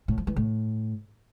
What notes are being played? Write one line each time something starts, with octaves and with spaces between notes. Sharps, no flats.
A2
F3
E3
A2